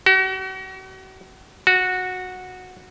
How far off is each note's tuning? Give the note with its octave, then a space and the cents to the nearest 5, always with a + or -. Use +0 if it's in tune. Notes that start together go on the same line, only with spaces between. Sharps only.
F#4 +40
F#4 -10